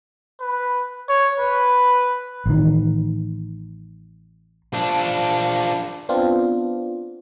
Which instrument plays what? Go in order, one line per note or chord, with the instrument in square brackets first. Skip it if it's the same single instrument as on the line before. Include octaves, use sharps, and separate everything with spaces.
[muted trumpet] B4
C#5
B4
[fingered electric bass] A1 D#3
[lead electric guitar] F3 D4
[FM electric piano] B3 C4 D4 F4